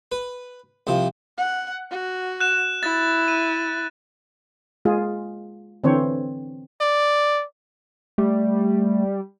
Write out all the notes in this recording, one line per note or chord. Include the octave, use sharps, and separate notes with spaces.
B4
C2 C3 F3
F#5
F#4
F#6 E7
E4 A6
D#7
G#3 F4 G#4
D3 E3 C4 C5 C#5
D5
G3 A3